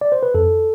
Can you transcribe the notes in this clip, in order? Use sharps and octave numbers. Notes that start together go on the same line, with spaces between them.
D5
C5
B4
F2 A4